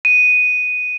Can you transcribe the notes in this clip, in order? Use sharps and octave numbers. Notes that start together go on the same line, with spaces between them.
D#7